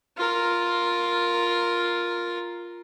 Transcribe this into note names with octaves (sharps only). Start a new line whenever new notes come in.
F4 A#4